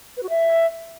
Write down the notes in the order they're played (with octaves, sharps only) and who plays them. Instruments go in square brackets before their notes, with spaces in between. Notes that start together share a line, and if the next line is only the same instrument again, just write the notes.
[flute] B4
F#4
E5